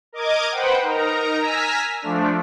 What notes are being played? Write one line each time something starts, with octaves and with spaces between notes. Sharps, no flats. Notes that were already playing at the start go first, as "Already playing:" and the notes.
A#4 D#5 D6 G#6
B4 C5 F#5 G5
D#4 A#4 A#5
G#5 A#5 E6 F6 B6
F3 A3 D4